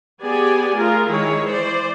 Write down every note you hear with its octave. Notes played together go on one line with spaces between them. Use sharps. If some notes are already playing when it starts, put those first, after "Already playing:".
B3 G4 G#4 D5 G#5
A3 F4 G#4 A#4
D#3 G#3 E4 G#4 C#5
E3 C5 D5